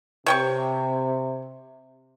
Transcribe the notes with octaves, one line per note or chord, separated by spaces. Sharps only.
C3 C#5 G5 C#6